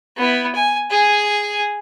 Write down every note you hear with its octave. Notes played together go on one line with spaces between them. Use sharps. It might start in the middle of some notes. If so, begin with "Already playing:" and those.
B3 E4
G#5
G#4 G#5